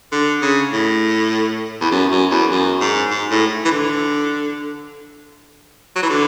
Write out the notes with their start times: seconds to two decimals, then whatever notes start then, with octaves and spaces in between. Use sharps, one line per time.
0.12 D3
0.42 C#3
0.72 A2
1.81 E2
1.91 F#2
2.11 F#2
2.31 E2
2.51 F#2
2.81 G#2
3.11 G#2
3.31 A2
3.65 E3
3.71 D3
5.96 F#3
6.03 E3
6.10 D3